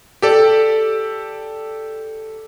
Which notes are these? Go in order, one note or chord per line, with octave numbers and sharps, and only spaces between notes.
G4 A4 D5